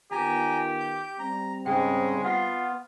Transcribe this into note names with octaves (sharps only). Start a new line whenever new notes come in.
D#3 B3 F4 G4 G#5 A#5
G6
G3 C4 A#5
G#2 C#3 G#3 G5
B3 F4 F5 F#5